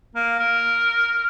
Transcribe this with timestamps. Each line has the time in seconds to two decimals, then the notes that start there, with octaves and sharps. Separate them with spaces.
0.15 A#3
0.39 A#4